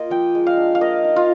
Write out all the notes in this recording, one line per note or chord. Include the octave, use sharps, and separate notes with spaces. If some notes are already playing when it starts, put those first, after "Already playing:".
Already playing: A#3 F4 D#5
F3 G5
G#3
F5
D4
F5
A#3 D#5
D#4
F4